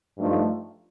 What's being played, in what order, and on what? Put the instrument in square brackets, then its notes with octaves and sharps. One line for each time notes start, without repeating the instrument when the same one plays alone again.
[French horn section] G2 F3 A3 D#4